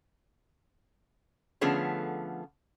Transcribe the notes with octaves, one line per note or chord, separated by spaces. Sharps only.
D3 F3 A3 B3 C#4 G#4